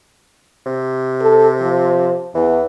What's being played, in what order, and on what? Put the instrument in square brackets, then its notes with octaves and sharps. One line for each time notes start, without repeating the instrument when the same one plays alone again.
[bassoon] C3
[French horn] A4
F3
[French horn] E2 [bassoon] E3